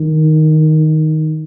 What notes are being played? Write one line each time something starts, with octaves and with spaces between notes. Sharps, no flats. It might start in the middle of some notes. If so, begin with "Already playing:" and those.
Already playing: D#3